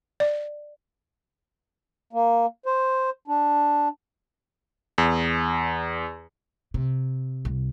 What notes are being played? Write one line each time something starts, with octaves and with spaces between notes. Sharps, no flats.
D5
A#3
C5
D4
E2
C3
C2